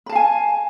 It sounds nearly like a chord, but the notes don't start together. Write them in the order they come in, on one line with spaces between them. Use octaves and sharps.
B5 A5 F5 G#5